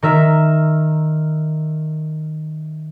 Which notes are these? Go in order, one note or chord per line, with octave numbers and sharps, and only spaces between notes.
D#3 A#4 E5